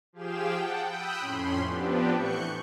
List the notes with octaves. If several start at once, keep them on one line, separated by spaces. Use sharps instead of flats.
F3 G4 G#4 F5 G5 E7
F#5 G5 A5
G5 B5 D#6 E6 F#6 G6
F2 A2 C#4 B5 C6
F3 B3 C4 D4 G4 B4
A2 E3 C#6 F#6 G6 C#7